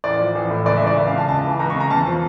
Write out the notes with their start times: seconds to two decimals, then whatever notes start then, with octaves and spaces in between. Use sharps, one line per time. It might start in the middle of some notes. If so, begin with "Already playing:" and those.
0.04 A1 D5
0.19 F3
0.35 A1
0.50 A2
0.66 C#2 D5
0.77 E5
0.82 E3 D5
0.97 C#2 E5
1.07 F5
1.13 C#3 A5
1.28 C#2 A5
1.44 E3
1.59 C#2 A#5
1.70 C#6
1.75 C#3 A#5
1.90 E2 A5
2.06 F3